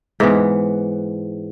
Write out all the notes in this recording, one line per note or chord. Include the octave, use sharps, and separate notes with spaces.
G#2 E3 B3